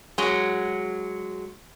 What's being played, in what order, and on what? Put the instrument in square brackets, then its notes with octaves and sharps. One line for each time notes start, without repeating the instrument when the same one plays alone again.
[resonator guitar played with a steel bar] F#3 G#3